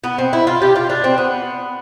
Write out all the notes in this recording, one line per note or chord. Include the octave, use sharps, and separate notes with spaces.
B3
C4
E4
F4
G4
F4
D4
C4
B3